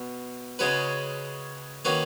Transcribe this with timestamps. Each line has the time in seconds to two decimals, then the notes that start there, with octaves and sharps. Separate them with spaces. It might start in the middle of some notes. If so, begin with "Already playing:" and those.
Already playing: B2
0.59 C#3 G#3 C#4 F#4 B4
1.85 D#3 A#3 C#4 F#4 B4